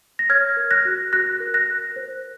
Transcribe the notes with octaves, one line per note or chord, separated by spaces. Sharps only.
A#6
C#5 F6 G#6
A#4
F#6 A#6
F#4
F#4 F#6 A#6
A#4
F#6 A#6
A#4
C5